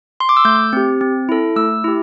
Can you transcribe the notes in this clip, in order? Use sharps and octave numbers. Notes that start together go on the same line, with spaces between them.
C6
D6
E6
A3 G6
C4 G4
C4
E4 A4
A3 E6
E4 G4